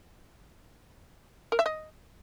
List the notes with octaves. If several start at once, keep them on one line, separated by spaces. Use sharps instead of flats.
A#4
E5
D#5